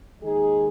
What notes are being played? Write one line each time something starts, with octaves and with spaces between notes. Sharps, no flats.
D#2 D#3 G#3 D#4 G#4